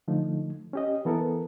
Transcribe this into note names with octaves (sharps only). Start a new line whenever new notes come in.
D3 F3 A3 D#4
C#4 G4 D#5
E3 B3 A4 A#4